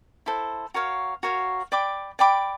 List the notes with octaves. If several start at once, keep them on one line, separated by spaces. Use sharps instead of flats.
E4 A4 C5
F#4 A#4 C#5 F5
F#4 A#4 C#5 F5
D5 G5 B5 D6
D5 G5 B5 D6